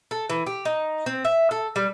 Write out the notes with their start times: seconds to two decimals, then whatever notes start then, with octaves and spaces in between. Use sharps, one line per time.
0.11 A4
0.30 E3
0.47 G4
0.65 D#4
1.06 C4
1.25 E5
1.51 A4
1.76 G3